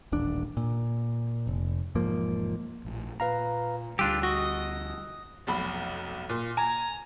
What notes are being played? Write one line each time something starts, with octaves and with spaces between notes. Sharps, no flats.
D#1 A1 D4
A#2
F1
E1 G#2 F3 A#3
A#1 A2
A#2 B4 F5 A#5
D2 D3 G3 D4 F4 G4 E6 F#6
F#4 D#5
F1 B1 B5
A#2
G#5 A#5